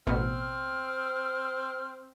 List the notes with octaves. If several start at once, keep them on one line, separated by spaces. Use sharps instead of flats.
A1 B2 C4 F6